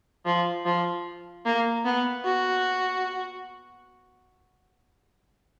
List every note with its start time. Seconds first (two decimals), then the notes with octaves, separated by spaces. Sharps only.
0.26 F3
0.66 F3
1.46 A#3
1.85 B3
2.25 F#4